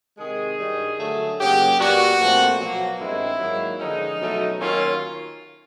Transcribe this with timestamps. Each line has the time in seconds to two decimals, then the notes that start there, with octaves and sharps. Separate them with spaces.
0.18 C3 D#3 G#3 G#4
0.58 G2 D#3 G3
0.99 D3 F#3 A3
1.38 F#2 C#3 F#3 A#3 G4
1.79 A#2 G3 B3 F#4
2.19 A#2 F3 A3 C4
2.59 B2 F#3 A#3
2.99 G2 D#3 G#3 C4 E4
3.39 G#2 D#3 F#3 A#3
3.80 D3 F3 G#3 C#4 D#4
4.20 B2 F#3 A3 C#4
4.60 D#3 F#3 A#3 C#4 F4